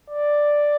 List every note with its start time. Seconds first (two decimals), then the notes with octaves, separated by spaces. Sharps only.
0.10 D5